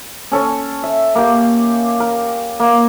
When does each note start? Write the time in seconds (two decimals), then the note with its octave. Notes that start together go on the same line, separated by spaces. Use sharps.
0.32 C#4 A4 C#5
0.83 E5
1.15 A#3 G4
2.00 A#4
2.60 A#3